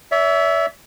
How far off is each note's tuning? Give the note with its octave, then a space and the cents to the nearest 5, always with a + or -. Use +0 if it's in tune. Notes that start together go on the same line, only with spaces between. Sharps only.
C#5 +45 E5 +0